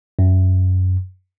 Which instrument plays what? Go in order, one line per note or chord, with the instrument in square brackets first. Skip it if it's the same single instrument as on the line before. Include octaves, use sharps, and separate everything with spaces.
[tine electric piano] F#2